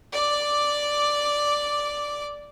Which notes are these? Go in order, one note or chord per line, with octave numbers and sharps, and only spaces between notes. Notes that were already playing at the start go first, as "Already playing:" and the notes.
D5 D6